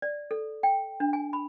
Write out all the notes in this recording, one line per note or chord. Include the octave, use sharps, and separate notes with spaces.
D5
A4
G5
D4
G#5
B5